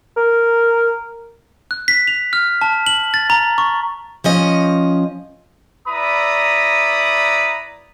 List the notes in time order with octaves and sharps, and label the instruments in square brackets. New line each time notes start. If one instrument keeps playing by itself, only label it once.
[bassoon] A#4
[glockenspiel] F#6
B6
F7
F6
A5
F#7
A6
A#5
C#6
[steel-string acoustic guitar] F3 C#4 D#5
[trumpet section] E4 B4 D5 A#5 B5 D#6